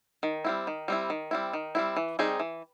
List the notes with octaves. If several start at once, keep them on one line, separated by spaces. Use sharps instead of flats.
D#3
G3 C4 E4
D#3
G3 C4 E4
D#3
G3 C4 E4
D#3
G3 C4 E4
E3
G3 C4 D#4 G#4
E3